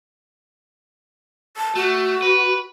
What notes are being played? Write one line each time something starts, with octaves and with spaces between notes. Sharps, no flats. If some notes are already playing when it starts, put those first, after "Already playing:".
A5
A3 F#4
B4